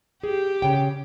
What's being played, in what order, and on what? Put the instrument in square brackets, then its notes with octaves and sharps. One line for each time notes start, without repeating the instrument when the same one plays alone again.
[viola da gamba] G4 [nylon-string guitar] G#4
[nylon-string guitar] C#3 G5